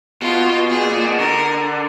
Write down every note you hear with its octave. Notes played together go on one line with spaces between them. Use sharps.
B2 F4
B2
B2 G#4
A#2
A#2
B2
D3 A#4